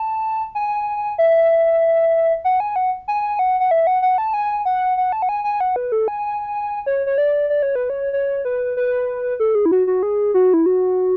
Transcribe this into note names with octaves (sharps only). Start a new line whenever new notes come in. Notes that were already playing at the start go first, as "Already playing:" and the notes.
Already playing: A5
G#5
E5
F#5
G#5
F#5
G#5
F#5
F#5
E5
F#5
F#5
A5
G#5
F#5
F#5
A5
F#5
G#5
G#5
F#5
B4
A4
G#5
C#5
C#5
D5
D5
C#5
B4
C#5
C#5
B4
B4
A4
G#4
E4
F#4
F#4
G#4
F#4
E4
F#4